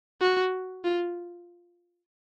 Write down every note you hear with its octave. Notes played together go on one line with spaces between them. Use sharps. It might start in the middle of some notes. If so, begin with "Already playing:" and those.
F#4
F4